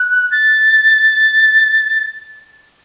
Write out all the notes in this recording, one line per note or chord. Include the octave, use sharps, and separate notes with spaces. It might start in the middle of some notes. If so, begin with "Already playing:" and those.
Already playing: F#6
A6